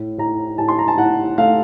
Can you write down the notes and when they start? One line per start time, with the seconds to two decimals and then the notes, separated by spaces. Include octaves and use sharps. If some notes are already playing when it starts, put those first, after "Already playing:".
Already playing: A2
0.18 A2 A#5
0.58 A2 A5
0.69 C6
0.79 A#5
0.88 A5
0.97 A2 F#5
1.38 A3 F5